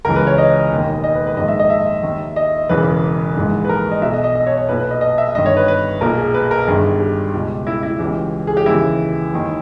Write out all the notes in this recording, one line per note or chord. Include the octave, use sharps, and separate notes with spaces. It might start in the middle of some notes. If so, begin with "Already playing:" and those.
C#2 C#3 E3 A#4
B4
C#5
D#5
E1 D#2 D#3
D#5
B4
B4
A#1 G#2 D#3 D#5
E5
D#5
E5
D#2 D#3
D#5
E1 E2 C#3 E3 B4
A#1 G#2 E3
B4
A#4
D#5
B1 B2 E5
D#5
D#5
D#5
C#5
C#5
B1 A#2 B4
B4
D#5
D#5
E5
G1 G2 D#3 D#5
C#5
B4
B4
B1 A#2 A#4
G#4
B4
A#4
G1 G2 D#3 G#4
G4
C#2 B2
E4
E4
C#2 C#3 E3 G4
G#4
G4
D#2 C#3 E3 E4
D#2 D#3